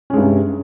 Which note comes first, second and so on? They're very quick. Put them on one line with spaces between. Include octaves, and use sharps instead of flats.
C#4 G#3 G2 C3